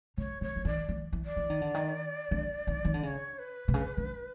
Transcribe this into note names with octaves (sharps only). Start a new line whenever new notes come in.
C#3 C#5
C#3 C#5
E3
D#3 D5
E3
E3
D5
E3
D#3
D3
D#3
D3
D#3
D#3
D3
C#3 C#5 D5
B4
C3
C#3
D3